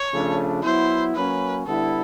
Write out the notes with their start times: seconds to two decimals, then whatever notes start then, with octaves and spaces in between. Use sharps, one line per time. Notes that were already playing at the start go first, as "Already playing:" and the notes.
Already playing: C#5
0.12 C#3 F3 A3 D4
0.63 F#3 B3 E4 C5
1.15 F#3 A#3 C#4 B4
1.66 D3 G3 B3 E4 A4